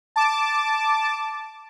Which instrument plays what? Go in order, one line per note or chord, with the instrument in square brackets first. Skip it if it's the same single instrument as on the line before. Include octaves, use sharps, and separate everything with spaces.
[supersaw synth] A5 D6